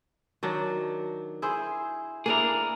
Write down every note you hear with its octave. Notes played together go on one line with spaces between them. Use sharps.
D#3 F#3 D4
E4 G#4 C5
A#3 D4 E4 G#4 A#4